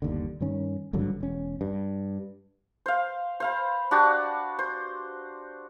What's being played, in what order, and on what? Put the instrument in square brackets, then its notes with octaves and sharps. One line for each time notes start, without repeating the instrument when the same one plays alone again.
[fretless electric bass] G1 D#2 D3
G2 D#3 C#4
G#1 G2 D3 F#3
E1 C#4
G2
[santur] C5 F5
C5 F5 B5
D4 F#4 G4 A5
C5